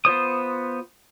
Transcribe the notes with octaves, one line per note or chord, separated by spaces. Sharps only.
B3 F4 C5 D#6